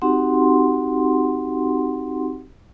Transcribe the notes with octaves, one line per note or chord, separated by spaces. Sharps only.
C4 D#4 F#4 G4 F#5 C6